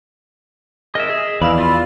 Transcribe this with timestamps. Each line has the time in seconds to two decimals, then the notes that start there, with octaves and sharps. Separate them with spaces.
0.95 G#4 A#4 D#5 E5
1.10 G#4
1.41 E2 E3 B4 D5 F5 B5 E6
1.59 F4